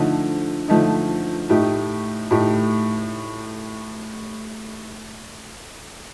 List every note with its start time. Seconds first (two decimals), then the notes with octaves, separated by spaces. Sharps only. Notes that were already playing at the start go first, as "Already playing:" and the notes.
Already playing: D3 F3 A3 D#4
0.68 D3 F3 A3 D#4
1.50 A2 A3 D#4 G4
2.31 A2 A3 D#4 G4